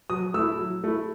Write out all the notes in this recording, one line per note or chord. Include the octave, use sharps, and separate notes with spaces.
F#3 D#6
A3 E4 E6
F#3
A3 E4